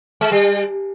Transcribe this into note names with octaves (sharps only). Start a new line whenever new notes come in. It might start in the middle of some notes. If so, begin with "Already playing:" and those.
G#3
G3